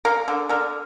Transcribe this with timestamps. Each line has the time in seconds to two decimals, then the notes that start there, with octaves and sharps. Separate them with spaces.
0.05 A#3 A#4
0.28 D3
0.49 D3 A#4